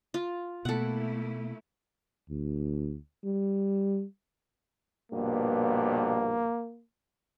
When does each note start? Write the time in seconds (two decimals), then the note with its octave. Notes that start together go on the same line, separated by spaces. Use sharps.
0.14 F4
0.65 B2 A3 A#3 E4 A4 F#5
2.30 D2
3.24 G3
5.12 A#1 G2 B2 A#3